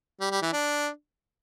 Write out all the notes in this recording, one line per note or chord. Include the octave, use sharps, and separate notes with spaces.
G3
G3
E3
D4